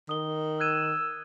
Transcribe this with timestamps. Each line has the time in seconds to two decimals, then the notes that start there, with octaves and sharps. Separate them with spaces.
0.09 D#3 D#6 G7
0.60 E6 F#6 G#6 D#7